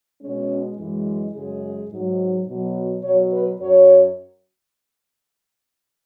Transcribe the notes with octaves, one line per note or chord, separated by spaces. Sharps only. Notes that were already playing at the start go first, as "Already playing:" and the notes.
B2 G#3 C#4
F#2 E3 G#3
F#2 C#3 G#3 G#4
G#2 F#3
B2 F#3
B2 F#3 C#5
B4
F#2 F#3 C#5